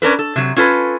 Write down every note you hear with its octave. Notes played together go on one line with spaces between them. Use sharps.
C#4 D4 A#4 B4
A4
C3 F#3
C#4 F4 A4 B4